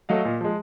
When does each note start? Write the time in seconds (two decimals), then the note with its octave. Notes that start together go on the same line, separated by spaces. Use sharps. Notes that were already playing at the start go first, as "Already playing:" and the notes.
0.09 F#3 A3 D#5 F5
0.25 A#2
0.41 F3 G#3